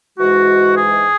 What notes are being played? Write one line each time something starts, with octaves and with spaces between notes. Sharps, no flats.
G#2 E3 G#3 F#4
G#4